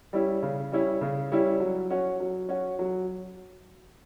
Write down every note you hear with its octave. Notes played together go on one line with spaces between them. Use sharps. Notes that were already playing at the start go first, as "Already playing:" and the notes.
G3 C#4 E4
C#3
G3 C#4 E4
C#3
G3 C#4 E4
F#3
C#4 F#4
F#3
C#4 F#4
F#3